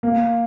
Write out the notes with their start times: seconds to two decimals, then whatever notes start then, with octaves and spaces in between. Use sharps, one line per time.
0.03 A#3